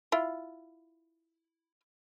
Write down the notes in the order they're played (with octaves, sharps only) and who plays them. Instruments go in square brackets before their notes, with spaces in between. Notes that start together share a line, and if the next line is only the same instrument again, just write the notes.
[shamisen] E4 F4